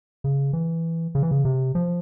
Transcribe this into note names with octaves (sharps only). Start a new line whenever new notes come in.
C#3
E3
C#3
E3
C#3
C3
F3